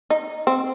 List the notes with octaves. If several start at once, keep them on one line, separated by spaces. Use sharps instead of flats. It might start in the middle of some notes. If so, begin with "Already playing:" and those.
D#4
C4